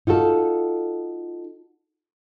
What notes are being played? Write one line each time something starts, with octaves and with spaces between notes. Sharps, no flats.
D#4 F4 F#4 A4